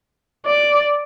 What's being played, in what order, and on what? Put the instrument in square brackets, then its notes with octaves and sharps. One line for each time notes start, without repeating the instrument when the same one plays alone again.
[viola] D5